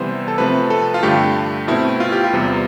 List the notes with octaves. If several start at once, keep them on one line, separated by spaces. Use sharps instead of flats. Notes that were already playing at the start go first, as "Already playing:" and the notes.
Already playing: C3 E3 G3 B3 C5
A4
C3 F3 A3 C4 B4
A4
F4
G2 D3 A3 G4
B2 A3 C4 E4
F4
G4
F4
E2 C3 G3 B3